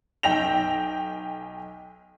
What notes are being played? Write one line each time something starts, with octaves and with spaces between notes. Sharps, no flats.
B1 G5 A#6 F7